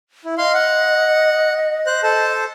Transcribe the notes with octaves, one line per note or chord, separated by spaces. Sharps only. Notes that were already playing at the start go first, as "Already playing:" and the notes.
E4
D#5 F5 C6
F#5
C5 F#6
A4 C5 A5